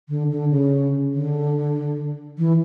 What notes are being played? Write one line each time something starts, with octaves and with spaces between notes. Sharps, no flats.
D3
D3
C#3
D3
E3